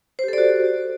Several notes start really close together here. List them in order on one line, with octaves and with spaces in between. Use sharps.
C5 G4 A4 D5 F#4